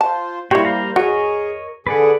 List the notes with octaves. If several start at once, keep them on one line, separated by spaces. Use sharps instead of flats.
F4 C5 A5
G3 A#3 E4 F#4 G4 C5 C#5
C5 F5 A#5
F#4 G#4 A#4 C#5 D#5
D3 G#4 B4 D5 F#5